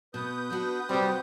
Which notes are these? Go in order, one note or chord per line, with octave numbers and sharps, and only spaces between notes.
B2 B4 D#6 G6
B3 D4 F#4
C3 G3 C4 F#4